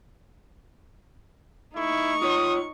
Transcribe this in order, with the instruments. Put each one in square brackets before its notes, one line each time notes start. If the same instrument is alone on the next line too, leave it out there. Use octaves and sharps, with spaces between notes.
[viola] D#4 C#6 [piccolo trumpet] E4
[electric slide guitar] F4 C#5 [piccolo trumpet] D#6